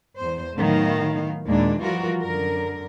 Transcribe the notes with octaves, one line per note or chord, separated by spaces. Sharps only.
E2 C5
A2 D#3 F#3 B3 F5
D#2 A#2 G#3 A#3 D4
E3 F3 G3 F4 F#4 A#4
F#2 D3 A#4